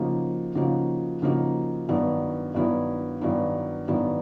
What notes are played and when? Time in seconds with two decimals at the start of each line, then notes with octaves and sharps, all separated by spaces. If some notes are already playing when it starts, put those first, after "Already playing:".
Already playing: C#3 F3 A#3 D#4 F#4
0.55 C#3 F3 A#3 D#4 F#4
1.22 C#3 F3 A#3 D#4 F#4
1.88 G2 D#3 F#3 B3 E4
2.54 G2 D#3 F#3 B3 E4
3.21 G2 D#3 F#3 B3 E4
3.88 G2 D#3 F#3 B3 E4